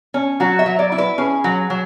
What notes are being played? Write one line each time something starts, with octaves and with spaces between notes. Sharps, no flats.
C#4
F#3 F#4
E5
F#3
D5
E4
B4
C#4 G#4
F#3
F#3